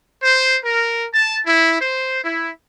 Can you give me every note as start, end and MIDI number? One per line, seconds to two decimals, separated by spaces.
0.22 0.57 72
0.64 1.06 70
1.13 1.39 81
1.46 1.78 64
1.80 2.18 72
2.24 2.50 64